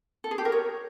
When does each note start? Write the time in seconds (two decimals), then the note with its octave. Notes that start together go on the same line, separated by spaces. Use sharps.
0.24 A4
0.31 G#4
0.38 G4
0.45 A#4
0.52 C#5